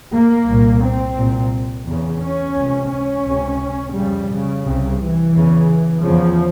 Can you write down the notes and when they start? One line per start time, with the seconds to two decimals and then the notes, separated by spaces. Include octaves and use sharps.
0.13 A#3
0.47 C2 A#2
0.82 C4
1.16 C2 A#2
1.86 E2 C#3
2.22 C#4
2.56 C#2 C3
2.91 C#4
3.25 C#2 C3
3.94 F2 C#3 G3
4.29 C#3
4.64 C2 C3
4.99 E3
5.33 E2 C#3
6.03 E2 C#3 F3